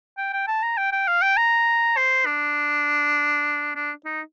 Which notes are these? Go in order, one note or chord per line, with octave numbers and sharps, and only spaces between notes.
G5
G5
A5
A#5
G5
G5
F5
G5
A#5
C5
D4
D4
D#4